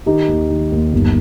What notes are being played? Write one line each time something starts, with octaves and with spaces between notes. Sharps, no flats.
D#3 D#4 G4
D#2
D#3
D#2
G1